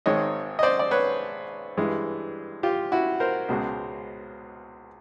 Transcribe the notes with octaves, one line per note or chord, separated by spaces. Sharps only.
G#1 G#2 D#3 G#3 C#5 D#5
D#5
C5 D5
D5
B4 C#5
G2 E3 G#3
F4 G4
E4 F#4
A#4 C5
C#2 B2 G#3